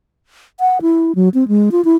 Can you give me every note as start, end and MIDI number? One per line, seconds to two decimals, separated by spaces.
0.60 0.78 78
0.82 1.15 64
1.15 1.29 54
1.34 1.48 60
1.48 1.70 56
1.72 1.84 65
1.85 1.96 64